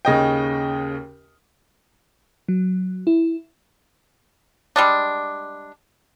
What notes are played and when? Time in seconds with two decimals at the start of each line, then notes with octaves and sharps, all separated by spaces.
0.05 D#2 C#3 D#5 G5
2.48 F#3
3.07 E4
4.76 G3 G#3 D4